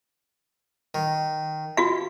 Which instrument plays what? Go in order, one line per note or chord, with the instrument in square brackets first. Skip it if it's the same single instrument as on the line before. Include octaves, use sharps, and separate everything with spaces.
[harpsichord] D#3
[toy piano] F4 F#4 F5